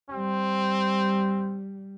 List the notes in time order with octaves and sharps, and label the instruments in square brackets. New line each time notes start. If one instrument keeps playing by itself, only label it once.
[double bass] G3 [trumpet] C4